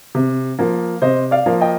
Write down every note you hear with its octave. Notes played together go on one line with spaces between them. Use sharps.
C3
F3 A#3
C3 C5 D#5
D5 F5
F3 A#3
D#5 G5